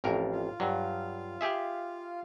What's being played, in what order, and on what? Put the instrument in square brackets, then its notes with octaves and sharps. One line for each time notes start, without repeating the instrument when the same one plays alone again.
[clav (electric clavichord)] A1 F2 A#4
[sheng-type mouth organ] F4 F5
[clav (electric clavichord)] G2 F#3
G4 G#4 E5